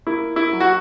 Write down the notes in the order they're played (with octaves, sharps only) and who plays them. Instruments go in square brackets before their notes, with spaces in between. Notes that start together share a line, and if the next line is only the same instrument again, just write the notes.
[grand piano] A#3 E4
E4
F#3
F#4